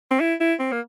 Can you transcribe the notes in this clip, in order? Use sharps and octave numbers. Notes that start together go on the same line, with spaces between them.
C4
E4
E4
C4
A#3